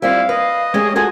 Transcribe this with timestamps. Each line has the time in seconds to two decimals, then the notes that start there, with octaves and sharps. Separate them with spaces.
0.02 G3 C4 E4 F4 F5
0.29 B4 D#5
0.74 G#3 A3 C#4 G4 G#4
0.96 F4 F#4 G#4 A4 G#5